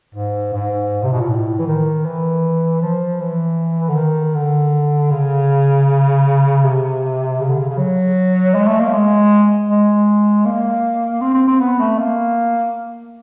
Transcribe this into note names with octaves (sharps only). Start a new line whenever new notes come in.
G#2
G#2
C3
B2
A#2
A2
E3
D#3
E3
F3
E3
D3
D#3
D3
C#3
C3
C#3
D3
C#3
C#3
F#3
G#3
A3
A#3
G#3
G#3
A#3
C4
C4
C4
B3
A3
A#3